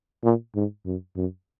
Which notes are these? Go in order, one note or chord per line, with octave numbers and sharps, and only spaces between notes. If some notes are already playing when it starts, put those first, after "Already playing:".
A#2
G#2
F#2
F#2